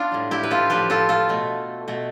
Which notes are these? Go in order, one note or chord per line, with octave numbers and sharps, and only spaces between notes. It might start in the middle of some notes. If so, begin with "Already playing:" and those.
Already playing: B3 D4 F4
A2 G3
E4 G4
B4
F4 A4
A2 F3 A3 G4 B4
F4 A4
F4 A4
B2 A3
B2 A3